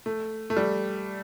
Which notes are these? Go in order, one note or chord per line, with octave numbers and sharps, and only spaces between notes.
A3
A3
G3